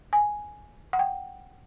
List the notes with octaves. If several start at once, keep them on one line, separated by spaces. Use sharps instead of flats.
G#5
F#5
G5